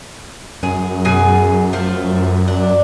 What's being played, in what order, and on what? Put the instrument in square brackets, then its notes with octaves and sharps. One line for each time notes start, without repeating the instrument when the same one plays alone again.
[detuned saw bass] F#2 [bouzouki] G#4
[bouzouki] B2 G#4 G#5
F3 A3
D4